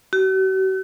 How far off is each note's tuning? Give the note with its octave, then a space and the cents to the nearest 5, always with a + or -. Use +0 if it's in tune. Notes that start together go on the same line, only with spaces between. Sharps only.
F#4 +45